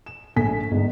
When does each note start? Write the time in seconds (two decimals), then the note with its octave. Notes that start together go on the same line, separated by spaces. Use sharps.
0.06 E7
0.36 A#1 A3 G#5 B6
0.71 G1 G#2